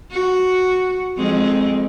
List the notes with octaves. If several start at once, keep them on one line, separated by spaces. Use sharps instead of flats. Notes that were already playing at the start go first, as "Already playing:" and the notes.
F#4
F2 G#3 C4